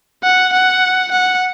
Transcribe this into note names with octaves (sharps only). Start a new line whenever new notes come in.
F#5
F#5
F#5